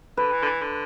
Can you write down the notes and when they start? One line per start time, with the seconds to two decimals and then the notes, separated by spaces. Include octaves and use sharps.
0.17 D3 B4
0.32 E3
0.42 D3
0.46 E3
0.61 D3